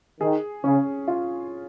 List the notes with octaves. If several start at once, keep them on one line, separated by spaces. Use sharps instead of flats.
D#3 G#4
C#3 C#4
F4